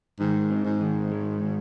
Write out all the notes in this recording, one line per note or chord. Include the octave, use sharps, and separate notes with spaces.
G#2 D#3
C4
G#2
D#3
G#3
D#3